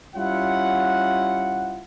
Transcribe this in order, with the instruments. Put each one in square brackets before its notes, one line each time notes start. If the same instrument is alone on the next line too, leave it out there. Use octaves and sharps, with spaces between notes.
[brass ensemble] G3 C#4 E4 F4 F#5